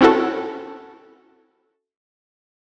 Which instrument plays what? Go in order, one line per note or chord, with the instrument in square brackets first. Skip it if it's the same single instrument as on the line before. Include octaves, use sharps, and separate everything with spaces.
[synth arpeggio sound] C4 C#4 E4 F#4 A4